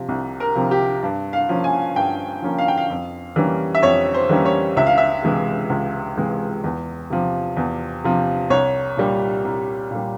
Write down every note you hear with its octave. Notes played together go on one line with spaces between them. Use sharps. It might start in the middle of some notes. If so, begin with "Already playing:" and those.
Already playing: C3 F3
C2
A#4
C3 F3
G4
G2
F5
F3 A#3 C#4
G#5
G2 G5
F3 A#3 C#4
F5
G5
F5
F2
E3 G3 A#3 C#4
E5
F2 C#5
C5
E3 G3 A#3 C#4
C#5
C#2 E5
F5
E5
C3 E3 G#3
C#2
C3 E3 G#3
E2
C3 F3
E2
C3 F3
C2 C#5
A#2 G3
C2
A#2 G3